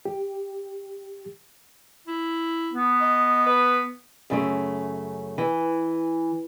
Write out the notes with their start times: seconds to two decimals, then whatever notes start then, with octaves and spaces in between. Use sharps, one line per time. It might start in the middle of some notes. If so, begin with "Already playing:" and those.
0.05 G4
2.07 E4
2.74 B3
3.01 D#5
3.46 B4
4.30 F#2 C#3 A3
5.38 E3